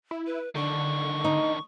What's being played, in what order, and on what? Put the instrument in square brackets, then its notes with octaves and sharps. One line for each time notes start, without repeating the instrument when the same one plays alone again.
[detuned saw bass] E4
[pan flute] B4
[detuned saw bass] D3 [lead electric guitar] D#3 D4 [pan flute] C#6
[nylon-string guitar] D#4